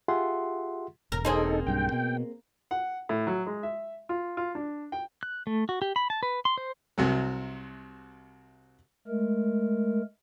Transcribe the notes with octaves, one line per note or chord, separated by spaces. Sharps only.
F4 G4 G#4 E5 F#5 C6
E1 A#4
A#3 C4 D#4 G#4 A4
B1 G2 G5
B2
F#5
A2
F#3
G#3
E5
F4
F4
D4
G5
F#6
A3
F#4
G4
B5
A5
B4
C6
C5
C2 C3 F#3
G#3 A3 A#4